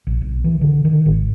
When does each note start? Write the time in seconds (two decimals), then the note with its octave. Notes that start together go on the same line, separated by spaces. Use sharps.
0.07 A#1
0.21 B1
0.44 E3
0.61 D3
0.85 D#3
1.06 G#1